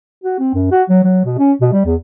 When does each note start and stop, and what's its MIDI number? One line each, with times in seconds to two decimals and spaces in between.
0.24 0.36 66
0.39 0.52 60
0.54 0.68 42
0.71 0.83 66
0.89 1.02 54
1.04 1.24 54
1.25 1.36 47
1.38 1.53 61
1.61 1.69 47
1.73 1.83 55
1.85 1.96 40